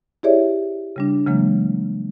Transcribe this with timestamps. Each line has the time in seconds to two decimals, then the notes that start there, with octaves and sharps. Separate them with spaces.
0.23 E4 G4 G#4 C#5 D5 E5
0.96 C#3 G3 D4
1.26 C#3 E3 F#3 G#3 A#3